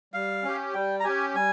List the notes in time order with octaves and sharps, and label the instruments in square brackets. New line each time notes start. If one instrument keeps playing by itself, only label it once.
[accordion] G3 [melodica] F5
[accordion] C#4 G4
[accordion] G3 [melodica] G5
[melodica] A#5
[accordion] C#4 G4 [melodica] G#5
[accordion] G3 [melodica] G#5